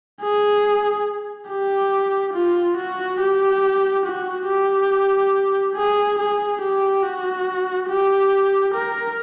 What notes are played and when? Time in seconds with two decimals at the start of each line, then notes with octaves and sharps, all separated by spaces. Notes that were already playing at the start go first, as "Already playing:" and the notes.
0.22 G#4
1.49 G4
2.34 F4
2.77 F#4
3.20 G4
4.06 F#4
4.48 G4
5.75 G#4
6.18 G#4
6.61 G4
7.03 F#4
7.89 G4
8.74 A#4